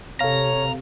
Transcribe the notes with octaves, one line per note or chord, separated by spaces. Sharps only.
C3 A4 C#5 F5 A#5